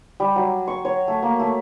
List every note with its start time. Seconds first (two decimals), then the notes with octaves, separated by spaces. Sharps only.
0.20 G3
0.36 F#3
0.68 C#6
0.85 C#5
1.08 A3
1.23 A#3
1.39 A3